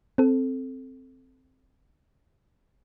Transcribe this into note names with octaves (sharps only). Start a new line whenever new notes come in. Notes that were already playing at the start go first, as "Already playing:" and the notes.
C4 A4